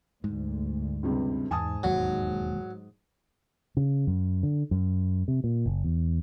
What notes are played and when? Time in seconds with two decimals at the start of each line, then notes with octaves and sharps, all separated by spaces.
0.24 D2 G#2
1.03 C#2 G2 C3
1.51 E2 G#2 G#5 A5 D#6
1.83 E1 D#2 F#3 G#3
3.77 C#3
4.07 F#2
4.43 D3
4.71 F#2
5.28 C3
5.44 A#2
5.66 F#1
5.84 E2